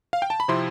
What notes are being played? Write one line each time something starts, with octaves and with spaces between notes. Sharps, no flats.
F5
G5
A5
B5
C3 F3 C4 E4 C6